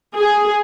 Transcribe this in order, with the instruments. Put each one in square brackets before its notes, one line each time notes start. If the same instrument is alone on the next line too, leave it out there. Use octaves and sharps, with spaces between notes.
[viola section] G#4